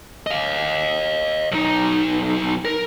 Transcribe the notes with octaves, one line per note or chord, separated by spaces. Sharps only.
D#5 F5
B1 D#4
A#4